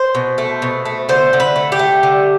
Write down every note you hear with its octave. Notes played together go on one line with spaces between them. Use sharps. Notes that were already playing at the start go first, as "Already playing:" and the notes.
Already playing: C5
B2
A3
B2
A3
D3 C5
D3
B4
A3
G4
A3
D3